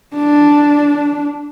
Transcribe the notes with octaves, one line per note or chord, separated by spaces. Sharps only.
D4